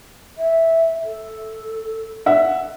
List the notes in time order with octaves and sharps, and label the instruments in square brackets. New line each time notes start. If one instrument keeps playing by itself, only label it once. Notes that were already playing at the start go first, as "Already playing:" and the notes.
[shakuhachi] E5
A4
[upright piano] E5 F#5